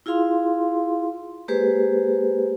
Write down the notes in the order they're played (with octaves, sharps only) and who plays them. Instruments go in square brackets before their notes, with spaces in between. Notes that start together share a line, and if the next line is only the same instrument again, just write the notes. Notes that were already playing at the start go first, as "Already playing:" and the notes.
[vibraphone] E4 F4 G#4 F5 C6
G#3 A#3 G4 G#4 B4 C5